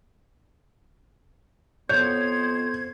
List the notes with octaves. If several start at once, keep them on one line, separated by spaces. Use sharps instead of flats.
F2 B3 C5 C#5 G6 G#6